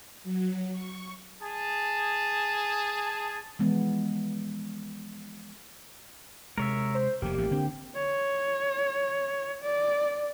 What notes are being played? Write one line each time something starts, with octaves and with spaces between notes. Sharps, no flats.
F#3
C#6
G#4 A5
E3 F3 G#3 B3
C3 G#3 A#4 C#5 E5
C5
F1 C3 A#3 G4
A1 A3
D3 C4
C#5
D5